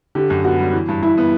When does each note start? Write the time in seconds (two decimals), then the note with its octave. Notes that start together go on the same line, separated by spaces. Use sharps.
0.15 D3 G4
0.30 F#2
0.44 B3 F#4
0.59 G3
0.73 E3
0.88 G2
1.02 G2 E4
1.18 B3